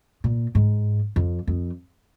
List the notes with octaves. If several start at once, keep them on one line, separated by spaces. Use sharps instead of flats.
A#2
G#2
F2
F2